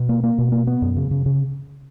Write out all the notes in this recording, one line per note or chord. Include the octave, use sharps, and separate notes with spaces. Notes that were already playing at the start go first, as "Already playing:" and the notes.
Already playing: B2
A#3
A#3
B2
A#3
B3
F#2
C#3
C#3
C#3